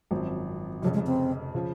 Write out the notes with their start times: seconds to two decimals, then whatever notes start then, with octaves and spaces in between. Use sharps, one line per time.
0.11 G#1 F#2 F3 C4
0.82 F1 F2 C#3 F#3
0.94 G#3
1.06 C4
1.55 C#3 F3